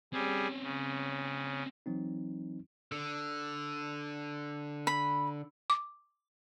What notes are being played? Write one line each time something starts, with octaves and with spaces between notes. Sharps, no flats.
G3 C4 C#4 G#4
C#3
E3 F#3 C4 D#4
D3
B5
D6